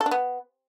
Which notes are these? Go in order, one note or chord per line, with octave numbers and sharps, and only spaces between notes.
A4
D4
B3